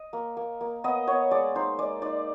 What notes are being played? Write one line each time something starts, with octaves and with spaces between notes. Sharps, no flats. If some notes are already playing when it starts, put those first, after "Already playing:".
Already playing: D#5
A#3
A#3
A#3
B3 D#5
B3 C#5
G#3 D5
D#4 C5
G#3 D5
D#4 D5